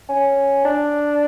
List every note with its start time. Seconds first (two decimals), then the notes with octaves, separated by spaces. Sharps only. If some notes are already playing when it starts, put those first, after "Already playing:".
0.09 C#4
0.65 D4